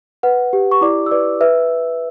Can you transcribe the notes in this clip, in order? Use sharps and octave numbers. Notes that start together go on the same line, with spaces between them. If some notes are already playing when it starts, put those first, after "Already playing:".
B4 F#5
G4
C#6
E4 D5 D6
E6
B4 D5 D6
B4 E5 E6